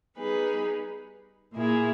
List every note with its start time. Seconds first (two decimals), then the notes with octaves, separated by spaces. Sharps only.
0.17 G3 B3 D#4 G#4 B4
1.54 A#2 A#3 E4 G#4